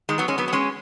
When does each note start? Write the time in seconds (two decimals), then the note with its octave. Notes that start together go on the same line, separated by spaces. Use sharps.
0.09 D#3 G#3
0.18 F#3 B3
0.28 G#3 C#4
0.38 F#3 B3
0.48 B3
0.53 G#3 C#4